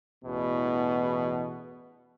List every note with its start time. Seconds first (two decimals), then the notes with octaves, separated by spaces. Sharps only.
0.23 A1 E2 B2